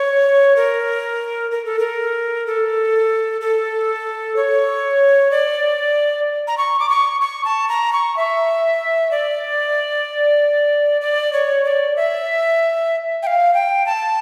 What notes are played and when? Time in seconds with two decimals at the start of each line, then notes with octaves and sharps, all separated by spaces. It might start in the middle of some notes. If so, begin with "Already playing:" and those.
Already playing: C#5
0.56 A#4
1.51 A#4
1.65 A4
1.79 A#4
2.46 A4
3.41 A4
4.36 C#5
5.31 D5
6.47 A#5
6.58 C#6
6.79 D6
6.89 C#6
7.21 C#6
7.45 A5
7.69 A#5
7.93 C#6
8.17 E5
9.11 D5
11.01 D5
11.33 C#5
11.65 D5
11.96 E5
13.23 G5
13.27 F5
13.54 G5
13.86 A5